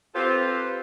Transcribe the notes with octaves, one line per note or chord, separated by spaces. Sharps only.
C4 F4 G4 A4 B4 C5